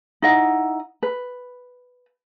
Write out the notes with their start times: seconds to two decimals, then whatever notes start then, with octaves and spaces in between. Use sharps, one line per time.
0.22 D#4 E4 D#5 F#5
1.03 B4